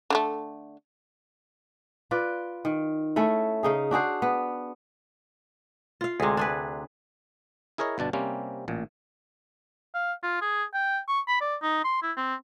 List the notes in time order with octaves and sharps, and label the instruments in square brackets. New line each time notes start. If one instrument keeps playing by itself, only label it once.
[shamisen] D3 G#3 A3
[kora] F4 B4 D5
D#3
A3 C#4 E4
C#3 D#4 G#4
D4 F#4 G#4 C5
B3
F4 F5
[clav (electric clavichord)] D2 C3 [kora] G#3 G#4
[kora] D4 G#4 B4
[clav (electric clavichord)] E4 G#4 A#4 C#5 D#5
G1 B2 D4 A5
C3 G3 A#3 C4 C#4
A1 A#2
[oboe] F5
F4
G#4
G5
C#6
B5
D5
D#4
C6
E4
C4